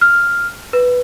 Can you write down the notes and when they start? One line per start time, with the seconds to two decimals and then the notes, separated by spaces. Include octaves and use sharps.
0.01 F6
0.73 B4